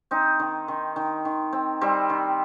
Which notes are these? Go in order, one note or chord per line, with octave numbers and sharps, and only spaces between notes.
C4 D#4
D#3
D#3
D#3
D#3
C4
G3 C4
D#3